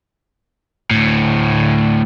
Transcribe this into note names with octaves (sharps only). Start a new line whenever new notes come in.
D2 A2